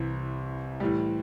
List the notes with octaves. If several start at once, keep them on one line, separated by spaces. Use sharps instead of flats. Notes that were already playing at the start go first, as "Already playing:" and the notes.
Already playing: C2 C3 E3
A2 E3 G3